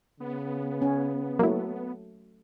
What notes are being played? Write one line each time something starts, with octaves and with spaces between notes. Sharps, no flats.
C#3 B3
C#4
F#3 A3 A#3 E4